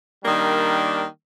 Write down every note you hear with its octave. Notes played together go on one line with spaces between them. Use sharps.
D#3 G3 A#3 D4